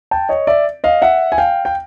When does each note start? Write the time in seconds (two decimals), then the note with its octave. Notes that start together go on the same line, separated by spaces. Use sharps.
0.11 G5 A5
0.29 C#5 D#5
0.47 D5 E5
0.84 D#5 F5
1.02 E5 F#5
1.32 G#5
1.38 F5 G5
1.65 G5